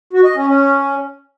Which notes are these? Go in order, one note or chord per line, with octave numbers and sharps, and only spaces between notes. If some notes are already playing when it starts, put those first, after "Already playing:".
F#4
D#5
C#4
C#4